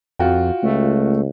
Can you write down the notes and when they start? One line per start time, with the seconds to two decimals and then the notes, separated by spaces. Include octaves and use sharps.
0.19 F2 F4 F#4 G5
0.63 C#2 A3